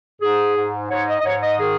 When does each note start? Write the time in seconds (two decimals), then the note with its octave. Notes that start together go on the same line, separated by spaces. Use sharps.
0.21 G#2 G#4
0.55 G#2
0.90 G#2 C#5
1.08 D#5
1.19 D#5
1.24 G#2 C#5
1.42 D#5
1.58 D#3 G#4